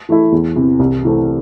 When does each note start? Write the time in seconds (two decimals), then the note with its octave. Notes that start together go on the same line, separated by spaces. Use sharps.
0.09 E3 A3 E4
0.32 E2
0.56 C3 E3
0.79 C2
1.03 C3 E3 A3 C4